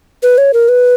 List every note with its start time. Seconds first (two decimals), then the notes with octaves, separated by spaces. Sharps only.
0.23 B4
0.38 C#5
0.53 A#4
0.69 B4